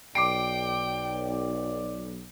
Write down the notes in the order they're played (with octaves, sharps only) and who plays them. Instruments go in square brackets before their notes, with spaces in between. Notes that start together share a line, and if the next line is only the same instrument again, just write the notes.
[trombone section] B1 [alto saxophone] D5 [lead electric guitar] G5 [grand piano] D6 C7 D7